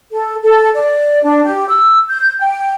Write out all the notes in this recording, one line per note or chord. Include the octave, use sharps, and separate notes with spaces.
A4
A4
D5
D4
G4
E6
G6
G5